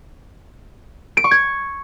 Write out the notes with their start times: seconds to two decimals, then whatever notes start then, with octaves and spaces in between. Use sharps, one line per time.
1.17 D7
1.24 C#6
1.31 G#6